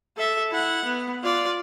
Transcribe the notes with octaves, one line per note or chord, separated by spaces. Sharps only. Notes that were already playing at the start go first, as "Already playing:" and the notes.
A4 E5
E4 F#5
B3
F4 D5